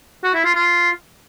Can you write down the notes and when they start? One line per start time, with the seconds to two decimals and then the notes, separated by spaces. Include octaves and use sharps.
0.24 F#4
0.34 E4
0.45 F4
0.55 F4